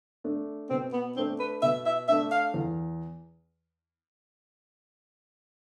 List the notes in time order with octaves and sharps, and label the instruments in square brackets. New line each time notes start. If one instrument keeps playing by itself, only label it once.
[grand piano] A3 D4
[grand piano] B2 [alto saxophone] C4
[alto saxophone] B3
[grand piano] A3 D4 [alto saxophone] C4
[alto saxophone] B4
[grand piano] B2 [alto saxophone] E5
[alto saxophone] E5
[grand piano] A3 D4 [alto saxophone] E5
[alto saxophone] F5
[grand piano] E2